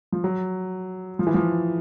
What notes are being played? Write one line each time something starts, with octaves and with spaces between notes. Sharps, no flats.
F3
F#3
F3
E3
F3